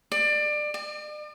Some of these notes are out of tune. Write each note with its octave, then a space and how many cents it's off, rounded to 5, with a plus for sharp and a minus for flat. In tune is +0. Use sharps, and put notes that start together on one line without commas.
D5 +25
D5 +45